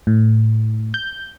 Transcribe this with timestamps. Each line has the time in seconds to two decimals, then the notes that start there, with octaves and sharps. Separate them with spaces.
0.07 A2
0.94 G6